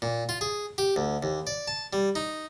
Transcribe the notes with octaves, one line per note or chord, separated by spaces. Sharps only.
A#2
F4
G#4
G4
D2
D#2
D5
A5
G3
D#4